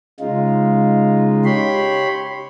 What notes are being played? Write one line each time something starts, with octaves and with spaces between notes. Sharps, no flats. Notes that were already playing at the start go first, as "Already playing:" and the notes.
C#3 G#3 D#4 F4
G4 C#5 B5 C6